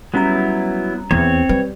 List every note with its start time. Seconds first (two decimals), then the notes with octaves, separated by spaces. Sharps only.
0.14 F#3 G3 B3 C#4 E4 A#5
1.11 E2 C4 C#5
1.49 G3 B4